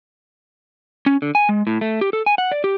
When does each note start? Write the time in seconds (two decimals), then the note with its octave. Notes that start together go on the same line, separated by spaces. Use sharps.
1.06 C#4
1.22 D3
1.35 G#5
1.49 G#3
1.67 A2
1.81 A3
2.01 G4
2.13 A4
2.26 G#5
2.38 F#5
2.52 D5
2.64 G4